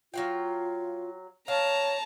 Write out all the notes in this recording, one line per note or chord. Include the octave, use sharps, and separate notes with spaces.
F#3 F4 F5 G5
C#5 F5 A5 A#5